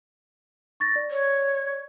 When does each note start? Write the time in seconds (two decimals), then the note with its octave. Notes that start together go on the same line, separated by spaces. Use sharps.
0.80 C#6 A6 A#6
0.96 D5
1.11 C#5